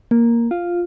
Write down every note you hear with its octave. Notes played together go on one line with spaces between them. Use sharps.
A#3
F4